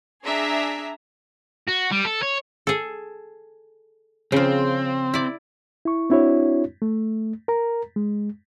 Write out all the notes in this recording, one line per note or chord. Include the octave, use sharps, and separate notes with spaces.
D4 G#4 E5 A#5
F#4
G3
A4
C#5
G#4 A4
C#3 F3 C4
E4 D5
E4 C#6
C4 D4 E4 F#4 C#5
A3
A#4 A#5
G#3